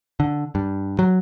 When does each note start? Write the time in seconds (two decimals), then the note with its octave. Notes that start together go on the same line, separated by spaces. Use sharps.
0.20 D3
0.55 G2
0.99 F#3